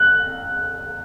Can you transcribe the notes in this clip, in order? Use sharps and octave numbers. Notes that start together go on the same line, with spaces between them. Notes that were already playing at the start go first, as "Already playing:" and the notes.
Already playing: F#6